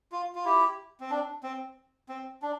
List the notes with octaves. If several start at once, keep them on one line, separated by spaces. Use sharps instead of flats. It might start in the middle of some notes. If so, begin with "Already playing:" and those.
F4
F4
E4 G4
C4
D4
C4
C4
D4